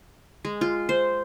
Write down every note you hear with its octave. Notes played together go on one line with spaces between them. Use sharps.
G#3
F4
C5